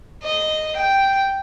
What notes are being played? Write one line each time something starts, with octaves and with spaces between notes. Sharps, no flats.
D#5
G5